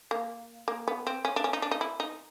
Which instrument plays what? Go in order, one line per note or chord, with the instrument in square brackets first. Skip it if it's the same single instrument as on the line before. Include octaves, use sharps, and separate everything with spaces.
[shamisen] A#3
A#3
B3
C4
C#4
D4
C#4
D#4
D4
D#4
E4
D#4